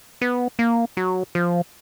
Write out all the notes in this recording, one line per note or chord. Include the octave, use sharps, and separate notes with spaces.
B3
A#3
F#3
F3